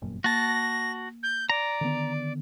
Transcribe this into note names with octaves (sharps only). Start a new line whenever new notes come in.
G1 F#2 A#2
A#3 F#4 A5 A#6
G6
D5 A#5
D3 D#3 B3